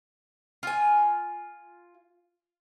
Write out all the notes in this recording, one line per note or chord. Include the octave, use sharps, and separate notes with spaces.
F4 G#5